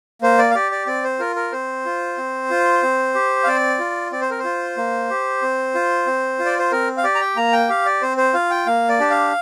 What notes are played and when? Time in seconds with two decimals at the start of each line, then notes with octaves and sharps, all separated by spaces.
0.22 A#3 C5
0.38 D5
0.51 F5
0.55 G4 D5
0.72 D5
0.87 C4 D5
1.04 C5
1.19 F4 A#4
1.36 A#4
1.52 C4 C5
1.85 F4
2.18 C4
2.50 F4
2.83 C4
3.14 G4
3.43 F5
3.46 C4 D5
3.79 F4
4.12 C4 D5
4.21 C5
4.31 A#4
4.39 C5
4.44 F4
4.77 A#3
5.10 G4
5.42 C4
5.75 F4
6.07 C4
6.39 F4
6.45 D5
6.59 C5
6.71 C4 A#4
6.97 F5
7.04 G4 D5
7.15 A#5
7.21 G5
7.36 A#3 A#5
7.53 G5
7.69 G4 F5
7.86 D5
8.02 C4 C5
8.17 C5
8.34 F4 F5
8.50 G5
8.66 A#3 F5
8.89 D5
9.00 D4 G4
9.10 F5